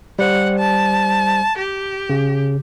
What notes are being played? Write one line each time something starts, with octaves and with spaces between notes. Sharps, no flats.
G3 C5 F#5
A5
G4
C#3